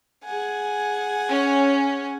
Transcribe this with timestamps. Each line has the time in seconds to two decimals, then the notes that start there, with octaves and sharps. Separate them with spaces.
0.24 G#4 F#5 G#5
1.29 C#4